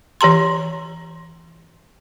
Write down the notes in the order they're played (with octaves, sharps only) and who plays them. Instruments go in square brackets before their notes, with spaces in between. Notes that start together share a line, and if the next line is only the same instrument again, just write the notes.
[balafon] E3 G4 A#5 C6